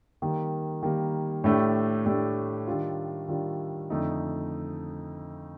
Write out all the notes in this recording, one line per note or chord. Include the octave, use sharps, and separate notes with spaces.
D#3 G3 A#3
D#3 G3 A#3
A2 A3 D4 G4
A2 A3 D4 G4
D#3 G3 D4 F4
D#3 G3 D4 F4
F2 D3 A3 D#4